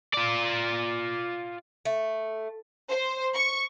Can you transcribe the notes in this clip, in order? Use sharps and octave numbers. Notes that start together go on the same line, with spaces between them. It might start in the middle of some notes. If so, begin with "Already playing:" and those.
F4 D5
A3
C5
C#6